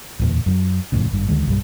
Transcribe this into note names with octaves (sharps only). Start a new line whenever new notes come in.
D1 E2 A#2
F#2 F3 F#3
E1 F2 A2 C#3
G#1 G2
D2 D3 D#3 G#3
B1 G2 G3